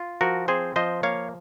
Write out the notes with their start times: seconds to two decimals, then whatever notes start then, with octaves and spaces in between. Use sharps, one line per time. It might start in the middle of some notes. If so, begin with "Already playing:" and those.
Already playing: F4
0.21 F3 F#4 A#4
0.48 C4 G#4 C5
0.76 F3 C5 D#5
1.03 A#3 C#5 F5